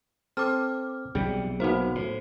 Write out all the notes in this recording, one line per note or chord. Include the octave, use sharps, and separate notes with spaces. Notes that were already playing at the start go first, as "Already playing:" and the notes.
C4 A4 D6 F6
B1 C3 G3 G#4
A#3 B3 D#4 F#4 C5
A2